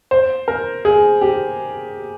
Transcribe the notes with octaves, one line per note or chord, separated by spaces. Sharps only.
C5
A#4
G#4
G4